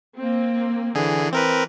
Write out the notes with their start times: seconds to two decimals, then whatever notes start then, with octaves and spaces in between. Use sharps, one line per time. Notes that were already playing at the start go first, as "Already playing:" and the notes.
0.17 A#3 C4
0.95 D3 E3 G#4
1.32 C4 A#4 B4